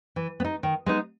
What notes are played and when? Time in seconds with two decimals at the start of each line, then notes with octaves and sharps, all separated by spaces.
0.16 E3
0.40 B3
0.44 D#4
0.63 D#3
0.86 G#3 B3 D#4